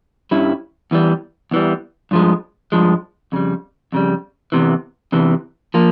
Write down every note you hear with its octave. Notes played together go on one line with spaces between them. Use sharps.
G2 G3 C#4 E4
E2 E3 G3
E2 E3 G3
G2 F3 G#3
G2 F3 G#3
F2 C#3 G3
F2 C#3 G3
E2 C3 E3
E2 C3 E3
F3 A#3